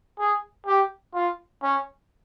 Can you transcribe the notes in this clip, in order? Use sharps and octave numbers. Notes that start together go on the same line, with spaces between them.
G#4
G4
F4
C#4